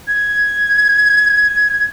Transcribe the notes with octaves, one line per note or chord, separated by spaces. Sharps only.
G#6